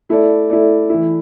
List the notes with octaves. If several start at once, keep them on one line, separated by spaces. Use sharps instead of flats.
A3 E4 A4 D5
A3 E4 A4 D5
E3 A3 E4